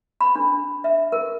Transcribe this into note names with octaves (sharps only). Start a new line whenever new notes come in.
B5
D4
E5
A#4